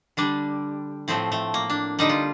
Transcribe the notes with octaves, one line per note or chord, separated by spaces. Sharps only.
D3 G3 D4
A2 F3 A3 C4
A3
A#3
D4
D3 G3 D#4
F4